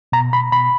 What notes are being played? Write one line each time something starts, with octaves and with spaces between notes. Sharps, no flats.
B2 A#5
B2 B5
B2 B5